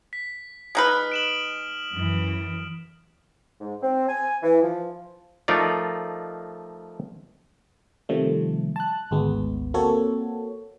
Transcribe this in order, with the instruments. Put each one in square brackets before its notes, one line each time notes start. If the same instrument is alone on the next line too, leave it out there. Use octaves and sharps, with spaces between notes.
[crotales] B6
[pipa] G#3 D#4 B4 [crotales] D#6 F6
[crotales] D7 E7 F#7
[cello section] F#2 E3
[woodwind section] G#2
C4
G#5
E3
F3
[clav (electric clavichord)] F3 A3 D#4 F4 A#4 D5
[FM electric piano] C3 D#3 F3 G3 A3
A5 F#6
G#1 D2 G#3 B3
A#3 C4 F#4 A4 C#5